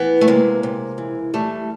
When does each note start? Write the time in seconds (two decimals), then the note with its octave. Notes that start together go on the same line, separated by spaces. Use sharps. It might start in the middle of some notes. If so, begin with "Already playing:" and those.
Already playing: E3 B3
0.21 A3
0.28 C3 G#3 A#3
0.63 C3
0.98 E3
1.34 E3 G3 A3